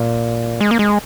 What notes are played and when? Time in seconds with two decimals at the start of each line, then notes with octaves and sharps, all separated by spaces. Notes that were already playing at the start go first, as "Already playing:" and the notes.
Already playing: A#2
0.61 G#3
0.71 A#3
0.79 G#3